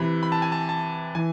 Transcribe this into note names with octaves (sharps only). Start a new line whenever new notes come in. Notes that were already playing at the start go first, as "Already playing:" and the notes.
Already playing: C3 E3 B5
B5
A5
G#5
A5
A5
E3 G#5